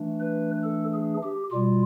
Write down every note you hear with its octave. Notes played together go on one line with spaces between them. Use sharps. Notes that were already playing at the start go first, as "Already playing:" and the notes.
Already playing: E3 A3 D4
B4
A4
G#4
G4
B2 G3 F4